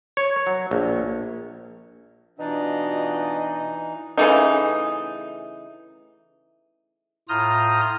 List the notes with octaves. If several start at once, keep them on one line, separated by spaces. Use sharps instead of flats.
C#5
F#3
A#1
B2 E3 D4 D#4 F4 F#4 D#5
C#3 E3 A3 D#4
A2 F4 A#5 D#6 F6 G6